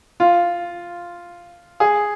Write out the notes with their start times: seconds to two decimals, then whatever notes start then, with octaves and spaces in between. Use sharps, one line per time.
0.20 F4
1.80 G#4